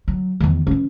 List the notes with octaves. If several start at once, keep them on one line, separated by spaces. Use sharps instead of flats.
F#3
E2 D#3
E3 C#4